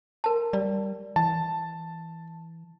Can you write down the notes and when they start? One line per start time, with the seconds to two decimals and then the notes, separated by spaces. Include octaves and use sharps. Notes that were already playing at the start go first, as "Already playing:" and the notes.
0.24 A#4 A5
0.53 G3 D5
1.16 E3 A5